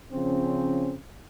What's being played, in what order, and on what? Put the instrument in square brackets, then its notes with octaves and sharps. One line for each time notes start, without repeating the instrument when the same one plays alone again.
[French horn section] C#3 F3 C4 C#4